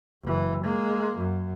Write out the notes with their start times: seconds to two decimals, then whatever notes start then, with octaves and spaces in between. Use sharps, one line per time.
0.24 F#1 E3
0.64 G#3 A#3
1.18 F#2